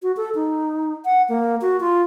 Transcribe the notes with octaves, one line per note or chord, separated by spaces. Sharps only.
F#4
A4
D#4
F#5
A#3
F#4
F4